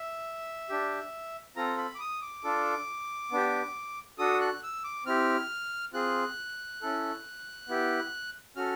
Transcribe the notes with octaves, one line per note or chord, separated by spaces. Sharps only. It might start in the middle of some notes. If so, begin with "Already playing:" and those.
Already playing: E5
D4 G4
C4 F4 A4 A#5
B5
D6
D#6
D6
D4 F4 A4
B3 D4 G4
D4 F#4 A4 D#6
F#6
E6
D6
C4 E4 G4 F6
C4 F4 G#4 F#6
C#4 E4 A4
B3 E4 G4
C#4 F#4 A4 F6